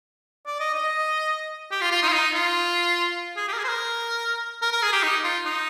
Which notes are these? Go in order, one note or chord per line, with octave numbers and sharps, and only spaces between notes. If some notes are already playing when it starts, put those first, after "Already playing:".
D5
D#5
D#5
G4
F4
F4
D#4
F4
D#4
F4
G#4
G4
A#4
G#4
C5
A#4
A#4
A#4
G#4
G4
D#4
F4
D#4